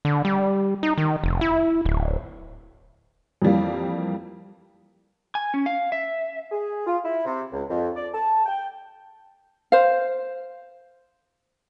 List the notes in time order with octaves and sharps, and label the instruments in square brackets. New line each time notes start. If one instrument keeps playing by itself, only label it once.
[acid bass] D3
G3
D#4
D#3
F1
E4
D1
[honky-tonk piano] F2 E3 G3 A#3
[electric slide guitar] G#5
C#4
F5
E5
[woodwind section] G#4
F4
E4
C3
C#2
F2
D5
A5
G5
[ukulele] C5 F5